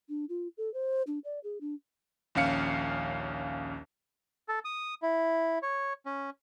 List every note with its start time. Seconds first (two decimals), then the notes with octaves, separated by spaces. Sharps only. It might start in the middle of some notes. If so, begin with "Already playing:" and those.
0.09 D4
0.29 F4
0.58 A4
0.74 C5
1.07 D4
1.24 D5
1.44 G#4
1.61 D4
2.35 A#1 D#2 C#4 F5 C#7
4.48 A4
4.65 D#6
5.02 E4
5.63 C#5
6.06 C#4